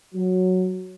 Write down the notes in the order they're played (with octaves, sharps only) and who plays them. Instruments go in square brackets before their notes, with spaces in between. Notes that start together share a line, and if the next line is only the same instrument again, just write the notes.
[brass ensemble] F#3